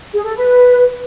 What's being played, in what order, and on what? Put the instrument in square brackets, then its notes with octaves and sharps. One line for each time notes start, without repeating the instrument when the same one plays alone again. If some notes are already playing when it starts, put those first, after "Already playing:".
[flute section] G#4
A4
B4